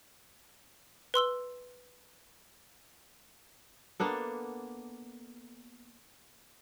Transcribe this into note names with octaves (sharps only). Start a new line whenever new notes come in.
B4 C6 E6 G7
A#3 B3 D4 A4